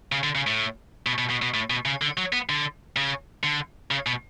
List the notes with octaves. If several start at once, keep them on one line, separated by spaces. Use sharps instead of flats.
C#3
D3
C#3
A2
B2
B2
B2
B2
A2
B2
C#3
D3
F#3
B3
D3
C#3
D3
C#3
B2